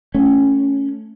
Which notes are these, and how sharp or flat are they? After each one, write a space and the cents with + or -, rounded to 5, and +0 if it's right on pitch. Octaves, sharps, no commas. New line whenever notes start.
A3 +0 C#4 +0